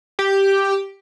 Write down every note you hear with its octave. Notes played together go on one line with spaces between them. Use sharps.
G4